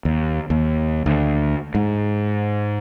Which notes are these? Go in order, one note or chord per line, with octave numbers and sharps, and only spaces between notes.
D#2
D#2
D2
G#2